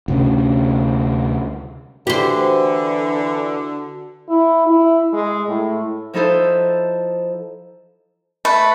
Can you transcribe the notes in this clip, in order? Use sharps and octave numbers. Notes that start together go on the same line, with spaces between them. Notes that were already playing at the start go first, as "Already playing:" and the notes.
D2 C3 C#4
D3 E3 F#4 G4 C5
E4
E4
G#3
A2
F3 D#4 E4 A4 C5
A3 B4